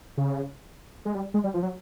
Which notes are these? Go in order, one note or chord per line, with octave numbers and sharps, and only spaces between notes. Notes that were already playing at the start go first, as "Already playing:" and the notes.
C#3
G#3
G3
G#3
G3
F3
F#3